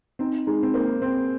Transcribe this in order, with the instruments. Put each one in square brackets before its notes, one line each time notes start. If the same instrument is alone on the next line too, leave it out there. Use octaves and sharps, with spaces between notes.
[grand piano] C4 [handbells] D#4
[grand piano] G#3 [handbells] D#4
[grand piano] C4
[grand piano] A#3 [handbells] C5
[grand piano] C4 [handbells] C5